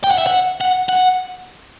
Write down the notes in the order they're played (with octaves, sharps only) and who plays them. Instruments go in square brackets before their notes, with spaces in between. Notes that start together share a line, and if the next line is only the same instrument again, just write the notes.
[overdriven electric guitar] G5
F#5
E5
F#5
F#5
F#5